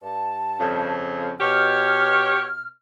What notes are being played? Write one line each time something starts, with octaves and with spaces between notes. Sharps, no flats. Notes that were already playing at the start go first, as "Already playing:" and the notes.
G2 A5
F2 C#3
B2 G4 C#5 F6